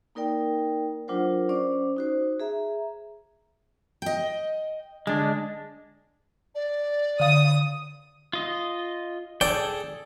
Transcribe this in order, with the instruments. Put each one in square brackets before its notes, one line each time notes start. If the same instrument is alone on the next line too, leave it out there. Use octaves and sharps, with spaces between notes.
[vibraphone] A#3 D#4 A#4 D5 G5
F#3 D4 F4 A#4 C5 F#5
C#4 C5 D5 D6
D#4 F#4 C5
G#4 E5 A#5
[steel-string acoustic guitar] D#5 G5
[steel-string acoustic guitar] D3 [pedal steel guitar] G#3 D4
[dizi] D5
[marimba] D3 F5 [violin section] D#6
[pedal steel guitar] F4 D#5
[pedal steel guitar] G#4 A4 G5 [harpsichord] D5